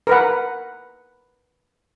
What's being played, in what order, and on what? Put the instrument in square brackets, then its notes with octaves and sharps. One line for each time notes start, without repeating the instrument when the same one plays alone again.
[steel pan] A#4 B4 F#5